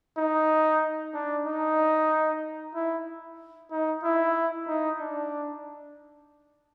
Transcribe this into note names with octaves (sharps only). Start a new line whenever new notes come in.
D#4
D4
D#4
E4
D#4
E4
D#4
D4